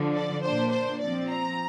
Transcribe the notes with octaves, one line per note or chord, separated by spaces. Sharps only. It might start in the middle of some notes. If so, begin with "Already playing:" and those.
Already playing: D3 F3 D4
D5
A#2 A#3 D4 C5
C5
F3 C4 D5
A#5